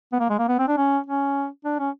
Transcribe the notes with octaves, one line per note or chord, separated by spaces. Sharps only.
B3
A#3
G#3
A#3
B3
C4
D4
C#4
C#4
D4
C#4